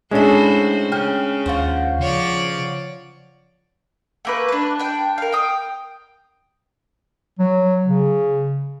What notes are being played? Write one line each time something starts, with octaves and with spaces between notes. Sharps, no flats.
A2 G#3 C#4 D4 F#4 C5 E5 B5
C#3 G4 F6 F#6
D#2 F4 F#4 C5
C#3 F3 C#5 D5
A3 A#3 B4
D4 B4
D4 G5
A#4 F5
G5 D#6
F#3
C#3